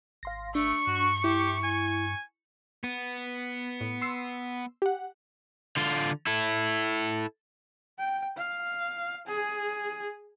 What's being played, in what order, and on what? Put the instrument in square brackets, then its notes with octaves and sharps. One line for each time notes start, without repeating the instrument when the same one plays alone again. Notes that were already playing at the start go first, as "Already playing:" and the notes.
[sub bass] G#1 [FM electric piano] F5 C6 A#6
[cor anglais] A3 [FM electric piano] D4 [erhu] C#6
[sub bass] G2 [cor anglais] F#4
[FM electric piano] E4 [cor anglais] G4
[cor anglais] G#5
[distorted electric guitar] B3
[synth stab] A2
C6 E6 C7
G4 F#5
[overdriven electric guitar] D3 F4
E4 A4
[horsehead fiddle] G5
F5
G#4